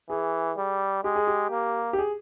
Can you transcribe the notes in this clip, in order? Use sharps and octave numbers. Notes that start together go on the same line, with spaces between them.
E3 G#4
G3
G#3 G4
G#4
G4
A#3
G4
G#4